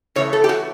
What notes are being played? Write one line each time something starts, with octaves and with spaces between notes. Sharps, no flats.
C#3 E3 A3 C#5
A4
G4
F#4